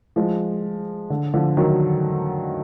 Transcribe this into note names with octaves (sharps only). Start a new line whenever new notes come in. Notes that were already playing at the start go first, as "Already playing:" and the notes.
F3 G#3
D3
D3 F3
D#3 F#3